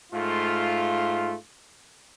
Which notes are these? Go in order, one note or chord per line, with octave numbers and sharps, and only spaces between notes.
G#2 A3 F4